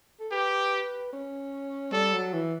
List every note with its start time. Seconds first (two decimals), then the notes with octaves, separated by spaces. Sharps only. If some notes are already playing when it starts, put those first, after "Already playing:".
0.20 A4
0.32 G4 B4
1.13 C#4
1.93 G3 A4
2.13 F#3
2.34 E3